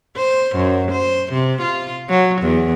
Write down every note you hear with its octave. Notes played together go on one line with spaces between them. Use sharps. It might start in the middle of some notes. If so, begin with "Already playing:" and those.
C5
F#2
C5
C3
F4
F#3
E2